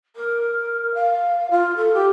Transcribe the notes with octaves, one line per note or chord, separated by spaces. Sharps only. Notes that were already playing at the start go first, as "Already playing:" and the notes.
A#4
F5
F4
A4
G4